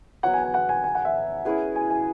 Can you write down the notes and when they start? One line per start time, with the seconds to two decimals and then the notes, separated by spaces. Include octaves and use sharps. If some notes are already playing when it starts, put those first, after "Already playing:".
0.23 F#3 B3 F#4 C#5 F#5
0.34 G#5
0.44 G#5
0.54 F#5
0.69 G#5
0.84 G#5
0.95 F#5
1.05 E5
1.45 C#4 E4 G#4 B4
1.76 G#5
1.90 G#5